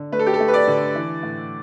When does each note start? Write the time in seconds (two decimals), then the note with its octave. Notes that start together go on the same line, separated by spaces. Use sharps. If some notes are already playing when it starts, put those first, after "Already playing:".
Already playing: D3
0.12 A3 B4
0.19 A4
0.26 G4
0.34 A4
0.40 A3
0.48 B4
0.54 D5
0.67 D3
0.95 E3
1.23 A2